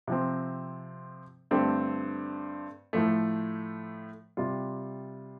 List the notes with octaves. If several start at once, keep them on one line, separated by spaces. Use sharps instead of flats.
C3 F3 C4
G2 D3 A3 C4 G4
A2 F3 A3
C3 G3 F4